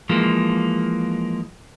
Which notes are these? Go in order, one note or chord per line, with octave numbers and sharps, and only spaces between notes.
E3 F3 G#3 A#3